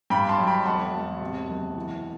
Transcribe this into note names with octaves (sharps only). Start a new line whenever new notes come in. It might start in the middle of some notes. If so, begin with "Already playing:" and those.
G2 G5 B5
A5 C6
F#3
G5 B5
E1 F#5 A5
E1
C3
F#1
E3